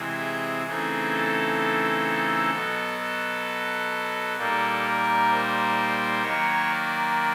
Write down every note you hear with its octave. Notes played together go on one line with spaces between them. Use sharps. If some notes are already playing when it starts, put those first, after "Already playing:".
Already playing: C3 E3 G#3 C4 E4
G#4
C#3 E3 A3 C4 D#4 G#4
A4
B2 F#3 B3
A4
A#2 G3 A#3 D#4 A4
A#4
C5
D#3 F#3 A#3 C#5
D5